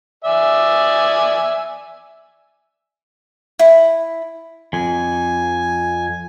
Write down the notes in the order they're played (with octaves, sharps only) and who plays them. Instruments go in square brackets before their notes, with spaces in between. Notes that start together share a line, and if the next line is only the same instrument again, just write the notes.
[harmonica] D5 E5 G#5
[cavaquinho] E4
[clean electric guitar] F2 [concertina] G#5